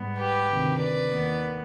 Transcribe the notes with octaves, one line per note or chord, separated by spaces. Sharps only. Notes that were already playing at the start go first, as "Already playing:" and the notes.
Already playing: G#2 G3 B3
G4 B4
D2 C3 D#3
B4 D5
D#2 D#3 B3